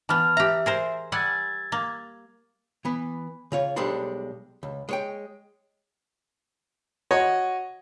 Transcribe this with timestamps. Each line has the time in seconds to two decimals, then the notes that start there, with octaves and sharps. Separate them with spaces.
0.09 E3 B3 A5 F6
0.37 G4 E5 A#5
0.66 G#4 A#4 C5
1.12 G3 F#5 G#5 E6 G#6 A6
1.72 A#3
2.85 E3 B3
3.52 C#3 F4 C#5
3.76 B1 G3 G#3 D4 A4 C5
4.63 C#2
4.89 G#3 C#5 G5
7.11 F#4 C#5 D#5